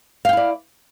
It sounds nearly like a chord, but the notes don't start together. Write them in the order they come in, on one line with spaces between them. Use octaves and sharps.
F5 G5 E4 D5